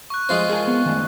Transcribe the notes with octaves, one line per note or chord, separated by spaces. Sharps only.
C#6 F#6
G#3 F4 C5
G#4 A#4 G#5
B3
D#3 A3